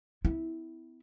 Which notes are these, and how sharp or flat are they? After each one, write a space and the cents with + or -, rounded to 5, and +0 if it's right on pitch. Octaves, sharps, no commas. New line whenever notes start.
B3 +45 E4 -15